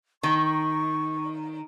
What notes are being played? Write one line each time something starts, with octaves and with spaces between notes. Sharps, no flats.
D#3 C#6